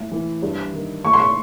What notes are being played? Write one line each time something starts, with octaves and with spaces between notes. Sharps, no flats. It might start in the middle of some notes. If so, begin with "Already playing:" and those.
Already playing: A2
E3
G2
D#3
A2 C#6
C6
C#6